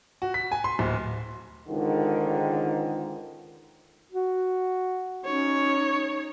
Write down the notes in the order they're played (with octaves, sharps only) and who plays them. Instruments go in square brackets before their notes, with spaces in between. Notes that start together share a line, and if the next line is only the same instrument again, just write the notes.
[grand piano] F#4
B6
G#5
C6
D1
[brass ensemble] C#2 G#2 D3 D#3
[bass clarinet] F#4
[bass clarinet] C#4 [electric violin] D#4 C#5